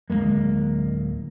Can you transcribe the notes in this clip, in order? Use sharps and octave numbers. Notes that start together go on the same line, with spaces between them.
D1 F#2 G#3 A#3